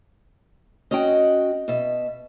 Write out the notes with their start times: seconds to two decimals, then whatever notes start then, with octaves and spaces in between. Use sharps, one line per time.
0.91 C#4 F#4 D#5 G5
1.68 B2 E5